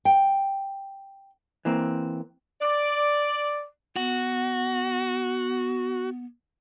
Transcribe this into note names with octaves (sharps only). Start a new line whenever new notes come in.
G5
E3 A#3 C4
D5
B3 F#4